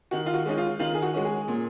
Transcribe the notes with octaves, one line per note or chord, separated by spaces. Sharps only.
D#3 F#4
F4
F#4
G#3 C#4 D#4
F4
D#3 F4
G#4
F#4
G#3 C#4 F#4
G#4
A#2